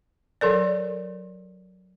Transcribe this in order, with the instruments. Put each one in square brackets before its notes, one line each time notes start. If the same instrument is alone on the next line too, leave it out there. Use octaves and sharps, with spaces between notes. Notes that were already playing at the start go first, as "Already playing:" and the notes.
[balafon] F#3 A4 A#4 D5